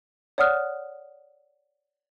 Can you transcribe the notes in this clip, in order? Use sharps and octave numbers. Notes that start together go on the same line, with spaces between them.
C#5 D5 F#5 D#6 F6 F#6